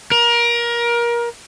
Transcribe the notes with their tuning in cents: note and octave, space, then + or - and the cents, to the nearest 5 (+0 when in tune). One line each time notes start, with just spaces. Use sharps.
A#4 +25